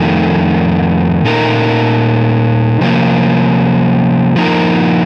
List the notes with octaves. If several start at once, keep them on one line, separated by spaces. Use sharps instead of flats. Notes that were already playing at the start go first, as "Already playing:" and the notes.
Already playing: F2 D#3 A3
A#2 A3 D#4 A#4
C3 F3 A#3
F3 A#3 D#4 A#4